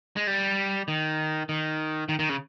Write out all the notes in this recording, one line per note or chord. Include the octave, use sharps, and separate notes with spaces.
G#3
G3
D#3
D#3
D#3
D#3
C#3